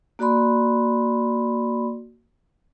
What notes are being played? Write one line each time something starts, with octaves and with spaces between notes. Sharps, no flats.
A#3 F#4 D5 B5 C6